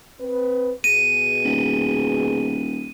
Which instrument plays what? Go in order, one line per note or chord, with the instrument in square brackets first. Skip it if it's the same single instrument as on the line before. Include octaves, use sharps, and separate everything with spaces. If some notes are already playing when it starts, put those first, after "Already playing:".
[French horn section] C4 B4
[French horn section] B2 G#4 [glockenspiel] D#7
[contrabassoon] D#1